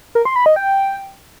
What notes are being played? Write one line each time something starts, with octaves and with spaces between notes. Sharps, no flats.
A#4
C6
B5
D#5
G5